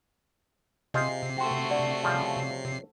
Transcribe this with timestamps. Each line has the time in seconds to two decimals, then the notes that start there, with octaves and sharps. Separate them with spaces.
0.94 C3 F4 G#4 C5 D#5 C7
1.38 A3 F#4 G5 C6
1.70 D3 D5
2.03 C#3 F3 G3